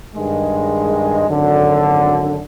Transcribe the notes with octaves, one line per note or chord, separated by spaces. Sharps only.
G2 D#3 G#3
G#1 F#2 D3